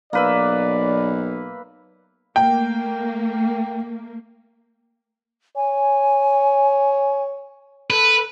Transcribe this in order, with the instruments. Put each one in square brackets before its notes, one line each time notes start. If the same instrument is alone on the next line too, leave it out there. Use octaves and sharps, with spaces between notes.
[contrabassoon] B1 [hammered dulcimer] A#3 B4 E5 [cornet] D5
[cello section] A3 A#3 [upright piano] G5
[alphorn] C#5 [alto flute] G#5
[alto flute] A4 [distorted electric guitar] B4